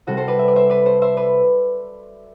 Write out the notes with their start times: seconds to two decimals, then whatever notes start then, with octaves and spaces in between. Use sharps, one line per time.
0.07 C2 C3 G3 F#4 A4
0.17 A4 C5
0.28 B4 D5
0.39 E5
0.48 D5
0.56 C5 E5
0.70 B4 D5
0.86 A4 C5
1.02 C5 E5
1.17 B4 D5